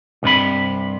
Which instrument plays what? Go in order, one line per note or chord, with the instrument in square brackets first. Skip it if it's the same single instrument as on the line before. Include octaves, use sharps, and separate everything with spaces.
[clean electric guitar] C2 G2 C3 B5